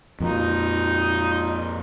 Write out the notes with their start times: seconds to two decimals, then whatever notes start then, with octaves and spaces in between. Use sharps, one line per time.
0.20 F2 A#2 D#4